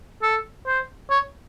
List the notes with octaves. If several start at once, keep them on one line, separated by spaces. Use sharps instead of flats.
A4
C5
C#5